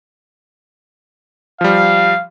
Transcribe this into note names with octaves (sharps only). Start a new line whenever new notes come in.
F3 G3 F5